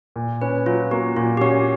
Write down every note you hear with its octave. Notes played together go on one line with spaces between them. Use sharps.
A#2
C#4 B4
F#3 F4
A#3 F#4
A#2 F4
G4
C#4 F#4